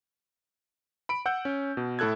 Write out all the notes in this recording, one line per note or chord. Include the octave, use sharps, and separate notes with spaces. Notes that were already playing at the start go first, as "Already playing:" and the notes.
B5 D7
F#5 E6 G6
C#4
B2
A2 E4 A4 F#6 G#6